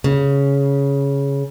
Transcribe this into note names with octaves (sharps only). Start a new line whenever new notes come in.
C#3